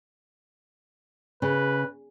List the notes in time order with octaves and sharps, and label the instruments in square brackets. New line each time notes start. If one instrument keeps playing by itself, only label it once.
[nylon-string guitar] C#3 [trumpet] B4